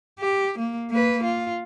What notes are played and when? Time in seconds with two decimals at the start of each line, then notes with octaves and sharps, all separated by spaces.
0.19 G4
0.59 A#3
0.90 A#3 B4
1.24 F4